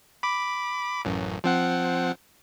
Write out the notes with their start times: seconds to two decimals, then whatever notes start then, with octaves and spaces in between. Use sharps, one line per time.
0.23 B5 D6
1.05 A1 F#2
1.44 F3 C4 F#5